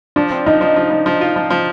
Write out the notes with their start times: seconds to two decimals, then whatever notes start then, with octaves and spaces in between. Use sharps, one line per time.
0.16 F3 D4
0.31 C4
0.46 F3 D#4
0.61 F3
0.76 F3
0.91 F3
1.06 F3
1.21 F4
1.36 F3
1.50 F3